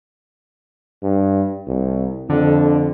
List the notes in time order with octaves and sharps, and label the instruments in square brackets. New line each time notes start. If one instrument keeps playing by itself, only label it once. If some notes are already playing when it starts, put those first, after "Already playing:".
[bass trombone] G2
C2
[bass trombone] F2 [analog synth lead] D3